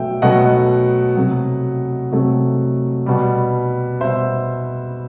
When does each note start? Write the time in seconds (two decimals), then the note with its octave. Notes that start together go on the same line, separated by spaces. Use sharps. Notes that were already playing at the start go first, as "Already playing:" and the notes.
Already playing: B2 F#3 A3 E5 G5
0.22 B2 F#3 A3 D#5 F#5
1.17 C3 F#3 A3
2.12 C3 F#3 A3
3.06 B2 G3
4.01 B2 G3 C5 E5